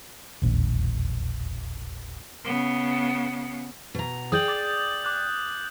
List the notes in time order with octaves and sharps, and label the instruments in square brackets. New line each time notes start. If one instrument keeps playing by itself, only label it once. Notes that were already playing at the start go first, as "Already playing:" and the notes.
[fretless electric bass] E1 A#1 D#2
[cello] C#3 B3
[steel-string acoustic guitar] B2 A#5
[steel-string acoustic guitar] G#4 D5 G5 [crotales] D#6 G6 F#7
[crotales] D6 A6
D6 F#6